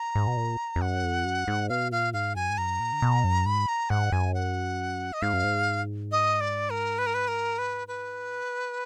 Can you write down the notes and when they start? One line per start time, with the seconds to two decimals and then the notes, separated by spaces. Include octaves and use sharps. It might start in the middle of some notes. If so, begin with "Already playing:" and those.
Already playing: A#5
0.15 G#2
0.27 B2
0.37 A#2
0.76 F2
0.81 F#2 F#5
1.03 F2
1.25 F#2
1.47 G#2
1.69 B2 F5
1.91 A#2 F5
2.13 G#2 F5
2.36 F#2 G#5
2.50 G#2
2.58 F#2 A#5
2.80 A#2
2.93 D3
3.02 B2
3.24 F#2
3.46 G#2 B5
3.69 A#5
3.90 G#2 F#5
4.12 F#2 G#5
4.34 F#5
5.13 D#5
5.22 G#2 F5
5.33 F#2
5.44 G#2
6.11 D#5
6.41 D5
6.70 A#4
6.99 B4
7.06 A#4
7.14 B4
7.28 A#4
7.58 B4
7.88 B4